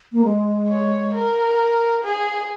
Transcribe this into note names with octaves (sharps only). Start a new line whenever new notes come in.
A#3
G#3
C#5
A#4
G#4